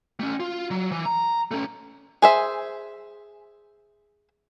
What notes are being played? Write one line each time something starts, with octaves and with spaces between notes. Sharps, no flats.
A3 C#4
F4
F#3
E3
A#5
A3 C#4
G#4 C5 E5